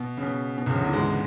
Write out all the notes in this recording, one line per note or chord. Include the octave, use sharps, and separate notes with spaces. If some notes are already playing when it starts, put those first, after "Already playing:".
Already playing: B2
C#3
B2
B2
C#2 C#3
D2 D3
E2 E3
G#2 G#3